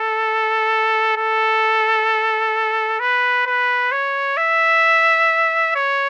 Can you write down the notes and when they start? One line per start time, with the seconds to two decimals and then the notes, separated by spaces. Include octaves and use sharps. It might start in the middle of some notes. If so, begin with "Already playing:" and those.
Already playing: A4
1.17 A4
3.00 B4
3.46 B4
3.92 C#5
4.38 E5
5.75 C#5